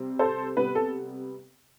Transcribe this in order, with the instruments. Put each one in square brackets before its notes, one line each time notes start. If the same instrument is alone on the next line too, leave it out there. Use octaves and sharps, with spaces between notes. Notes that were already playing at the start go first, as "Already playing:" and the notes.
Already playing: [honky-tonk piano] C3 G3 C4
A4 C5
C3 G3 B3 B4
A4